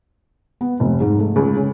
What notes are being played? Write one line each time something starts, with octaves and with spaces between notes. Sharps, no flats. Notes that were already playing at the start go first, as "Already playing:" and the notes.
B3
F1
G#2
A3
C#2
C#4